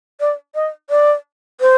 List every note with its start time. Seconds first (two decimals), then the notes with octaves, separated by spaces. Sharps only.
0.20 D5
0.55 D#5
0.90 D5
1.61 C5